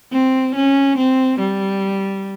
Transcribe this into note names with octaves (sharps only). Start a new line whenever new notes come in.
C4
C#4
C4
G3